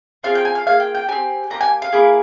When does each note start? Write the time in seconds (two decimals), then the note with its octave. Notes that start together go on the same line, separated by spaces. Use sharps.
0.24 C4 F4 G#4 F5
0.35 G5
0.45 G#5
0.55 F5
0.67 A#3 F4 G#4 F5
0.80 G5
0.95 G5
1.08 C4 G4 G#5
1.50 A#3 E4 G4 A#5
1.61 G#5
1.82 F5
1.92 A#3 E4 G#4